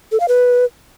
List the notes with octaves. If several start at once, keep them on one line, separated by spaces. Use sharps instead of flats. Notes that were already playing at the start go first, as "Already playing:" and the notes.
A4
F5
B4